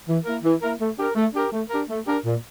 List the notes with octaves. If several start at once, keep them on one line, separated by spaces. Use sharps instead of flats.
E3
A#3 E4 A#4
E3
A#3 E4 A#4
A3
D4 G4 A#4
A3
D4 G4 A#4
A3
D4 G4 A#4
A3
D4 G4 A#4
A#2